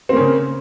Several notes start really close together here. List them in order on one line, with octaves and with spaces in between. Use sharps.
C4 A#3 C#4 C#3